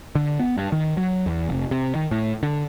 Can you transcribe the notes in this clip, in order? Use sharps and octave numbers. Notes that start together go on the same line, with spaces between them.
D3
B3
G2
D#3
F#3
E2
F1
C3
D#3
A2
D3